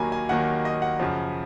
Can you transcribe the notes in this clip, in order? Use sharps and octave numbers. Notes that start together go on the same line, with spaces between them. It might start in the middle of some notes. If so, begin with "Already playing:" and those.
Already playing: D#2 D#3 F#3 A#3 G#5 A#5 B5
G#5
D#2 D#3 F#3 A#3 F#5
D#5
F#5
F#2 C#3 F3